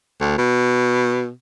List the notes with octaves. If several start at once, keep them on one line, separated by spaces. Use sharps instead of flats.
D2
B2